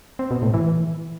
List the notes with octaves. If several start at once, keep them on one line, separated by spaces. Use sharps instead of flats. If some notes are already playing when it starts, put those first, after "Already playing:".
C4
B2
A2
E3